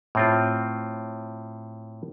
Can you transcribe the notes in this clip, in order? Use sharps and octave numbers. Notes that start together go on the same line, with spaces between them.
A2 C4 F4